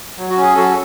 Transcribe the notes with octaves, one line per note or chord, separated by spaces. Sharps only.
F#3
F#4
C#4
G#4
F#3 F#4 A4